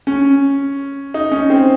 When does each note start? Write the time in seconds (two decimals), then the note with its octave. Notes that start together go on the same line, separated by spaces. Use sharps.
0.07 C#4
1.14 D#4
1.32 C#4
1.50 C4